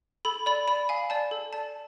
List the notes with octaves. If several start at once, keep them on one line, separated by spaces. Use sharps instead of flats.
A4 B5
D5 B5
D5 B5
F5 G#5
D5 A5
A4
D5 A5